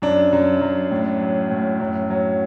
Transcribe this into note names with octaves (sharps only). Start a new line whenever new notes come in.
F#2 D4
F#2
F#2
A2
F#3
A2
F#2
F#3